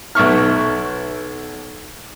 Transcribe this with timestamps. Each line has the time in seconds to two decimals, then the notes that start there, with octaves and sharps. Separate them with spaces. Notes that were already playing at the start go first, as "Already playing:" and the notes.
0.15 B1 E5 C#6 F6